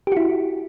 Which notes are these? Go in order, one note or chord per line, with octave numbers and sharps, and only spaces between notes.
E4 F#4 G4